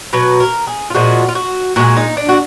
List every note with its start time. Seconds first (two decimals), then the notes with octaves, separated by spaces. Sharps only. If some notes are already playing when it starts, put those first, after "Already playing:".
0.13 B2 F#3 B4
0.40 A#4
0.67 G#4
0.90 F4
0.95 A#2 F3 G#3 F#4
1.29 F4
1.35 F#4
1.76 A#2 G#3 F#4
1.97 D#4
2.17 D4
2.29 F#4